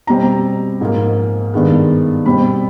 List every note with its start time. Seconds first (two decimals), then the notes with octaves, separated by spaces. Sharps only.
0.07 B2 G3 C4 A#5
0.81 G#2 F3 A#3
1.54 G2 D#3 G#3 B3
2.26 B2 G3 C4 B5